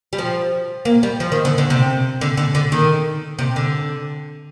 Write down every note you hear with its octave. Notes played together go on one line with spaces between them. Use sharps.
G3
F3
A#3
G3
F3
D#3
D3
D3
C3
D3
D3
D3
D#3
C3
D3